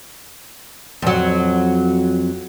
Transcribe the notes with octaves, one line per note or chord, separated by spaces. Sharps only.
F2 F#3